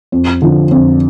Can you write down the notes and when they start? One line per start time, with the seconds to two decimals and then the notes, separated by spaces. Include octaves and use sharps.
0.12 F2
0.42 D3 F3
0.71 F2